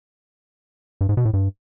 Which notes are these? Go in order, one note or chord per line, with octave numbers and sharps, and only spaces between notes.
G2
G#2
B2
A2
G2